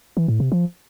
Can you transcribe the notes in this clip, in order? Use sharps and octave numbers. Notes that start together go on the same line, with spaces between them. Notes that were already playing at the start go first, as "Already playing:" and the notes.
E3
A2
C3
F3